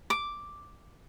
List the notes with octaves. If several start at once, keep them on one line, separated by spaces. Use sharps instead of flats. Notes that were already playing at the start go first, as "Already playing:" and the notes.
D6